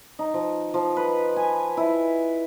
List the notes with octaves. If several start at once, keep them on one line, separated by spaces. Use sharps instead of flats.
D#4
F3
F3
B4
G#5
E4